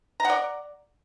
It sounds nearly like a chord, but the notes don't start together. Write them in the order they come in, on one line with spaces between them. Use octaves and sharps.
A#5 F#5 D5